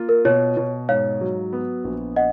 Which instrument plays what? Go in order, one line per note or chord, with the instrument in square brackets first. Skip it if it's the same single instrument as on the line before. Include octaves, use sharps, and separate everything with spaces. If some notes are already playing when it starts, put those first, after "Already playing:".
Already playing: [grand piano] A#3 F4
[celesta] A#4
[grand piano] B2 [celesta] C#5
[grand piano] B2
[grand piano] G#2 [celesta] C#5 F5
[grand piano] F#3
B3
A#1
[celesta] D#5 F#5